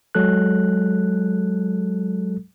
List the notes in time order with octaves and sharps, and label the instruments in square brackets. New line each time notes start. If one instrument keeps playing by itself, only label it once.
[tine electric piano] F#3 G#3 A4 F#6